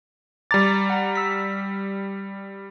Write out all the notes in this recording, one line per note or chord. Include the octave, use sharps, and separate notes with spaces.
G3 A#5 D6 A6
F#5 A#5
E6 B6